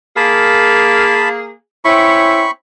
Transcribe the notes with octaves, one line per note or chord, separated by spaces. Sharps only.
A#3 G#4 A5 B5
C4 C#4 E4 B5 C#6